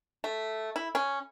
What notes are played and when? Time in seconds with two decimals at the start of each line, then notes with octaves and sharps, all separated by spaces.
0.24 A3
0.76 E4
0.95 C#4